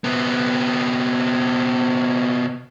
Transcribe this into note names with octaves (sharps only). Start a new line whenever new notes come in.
C3 B3